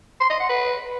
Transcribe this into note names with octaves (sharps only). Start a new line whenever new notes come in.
C6
D#5
F#5
B4